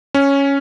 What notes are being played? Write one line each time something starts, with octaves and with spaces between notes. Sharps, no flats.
C#4